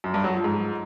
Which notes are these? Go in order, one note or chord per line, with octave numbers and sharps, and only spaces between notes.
F#2
G2
F#3
F3
G#2